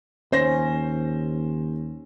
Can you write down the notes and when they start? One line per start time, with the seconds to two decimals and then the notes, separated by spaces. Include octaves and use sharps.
0.32 D#2 C#4 C5 A#6